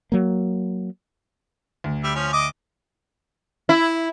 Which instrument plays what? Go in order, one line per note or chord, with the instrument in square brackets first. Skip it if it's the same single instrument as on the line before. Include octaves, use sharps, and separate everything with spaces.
[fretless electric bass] F#3 A#3
[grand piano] D2
[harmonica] G3 E5
F3 C#4
D#5 D6
[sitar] E4